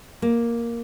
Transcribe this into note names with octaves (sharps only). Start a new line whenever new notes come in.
A#3